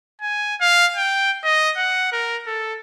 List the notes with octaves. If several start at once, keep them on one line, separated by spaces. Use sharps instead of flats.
G#5
F5
G5
D#5
F#5
A#4
A4